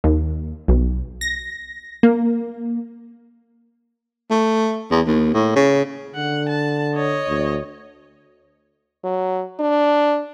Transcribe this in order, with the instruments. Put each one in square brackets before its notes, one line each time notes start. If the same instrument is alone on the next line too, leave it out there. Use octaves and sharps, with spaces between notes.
[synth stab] D#2
B1
A#6
A#3
[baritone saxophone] A3
E2
D#2
A2
C#3
[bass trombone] D3 [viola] F#5
[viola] A5
C#5 D#5
[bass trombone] D2
[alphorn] F#3
D4